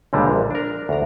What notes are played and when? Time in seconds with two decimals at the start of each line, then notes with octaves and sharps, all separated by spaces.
0.13 C#2 A#2 D3 G3 G#3
0.28 A#1
0.51 D4 A#4
0.89 D2 A#5